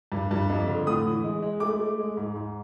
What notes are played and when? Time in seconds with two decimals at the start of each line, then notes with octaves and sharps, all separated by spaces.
0.12 G2
0.31 G2
0.50 F2
0.68 D3
0.86 A2 D#6
1.06 E3
1.24 G#3
1.42 G#3
1.60 A3 D6
1.79 A3
1.99 G#3
2.17 G#2
2.35 G#2